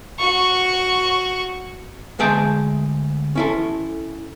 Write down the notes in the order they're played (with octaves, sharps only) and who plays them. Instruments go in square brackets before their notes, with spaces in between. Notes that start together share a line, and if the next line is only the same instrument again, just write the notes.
[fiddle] F#4 C#6
[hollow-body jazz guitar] D2 G#3 G#4 E5 G5 A5
C#4 E4 A4